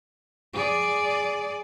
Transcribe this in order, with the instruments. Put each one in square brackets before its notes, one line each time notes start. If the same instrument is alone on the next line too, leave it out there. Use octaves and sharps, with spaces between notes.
[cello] G#4 D5